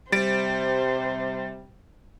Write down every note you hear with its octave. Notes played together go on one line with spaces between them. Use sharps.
C3 G3 C5 A6 D7